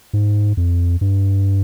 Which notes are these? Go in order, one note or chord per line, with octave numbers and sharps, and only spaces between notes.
G#2
F2
G2